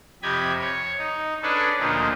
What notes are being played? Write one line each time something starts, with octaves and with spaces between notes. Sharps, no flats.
F2 C3 G4 D#5 B5 G#6
C#5
D#4
C#4 D4 G#4 A4 B4
D2 A#2 F3 D#4 F4